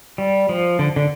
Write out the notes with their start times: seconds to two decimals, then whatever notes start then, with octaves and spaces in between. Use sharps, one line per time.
0.18 G3
0.49 F3
0.79 D3
0.96 D3